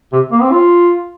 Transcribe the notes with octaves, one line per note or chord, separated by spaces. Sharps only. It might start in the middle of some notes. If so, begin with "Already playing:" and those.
C3
A#3
C4
F4